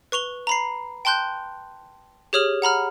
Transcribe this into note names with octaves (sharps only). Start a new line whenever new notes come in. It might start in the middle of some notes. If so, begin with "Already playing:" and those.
B4 C#6 F7 G7
A#5 B5 C7
G5 A5 C6 F#6 G6
G4 G#4 C#5 D#6 F6 F#7
F#5 A#5 B5 F6